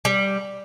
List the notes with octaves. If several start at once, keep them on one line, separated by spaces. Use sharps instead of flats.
G3